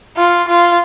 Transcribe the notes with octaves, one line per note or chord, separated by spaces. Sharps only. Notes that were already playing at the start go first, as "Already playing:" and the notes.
F4
F4